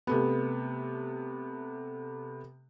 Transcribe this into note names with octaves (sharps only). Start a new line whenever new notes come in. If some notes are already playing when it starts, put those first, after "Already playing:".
C3 A3 B3